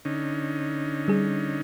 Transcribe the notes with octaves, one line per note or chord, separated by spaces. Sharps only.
D3 C#4 D#4
G3 G#4